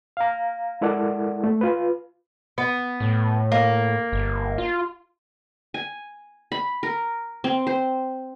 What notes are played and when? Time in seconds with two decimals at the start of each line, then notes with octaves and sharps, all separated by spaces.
0.17 F5 A#5
0.81 G#3 E4 A4 A#4 D5 F#5
1.44 A3
1.61 F4 B4
2.58 B3
3.00 A2
3.52 A#3
4.12 G1
4.58 F4
5.74 G#5
6.52 B5
6.83 A#4
7.44 C4
7.67 C5